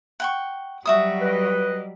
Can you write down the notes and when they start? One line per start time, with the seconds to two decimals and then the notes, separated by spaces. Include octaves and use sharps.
0.20 F#5 G5 C#6
0.85 F#3 G3 F#4 E5 D#6
1.22 B4 D#5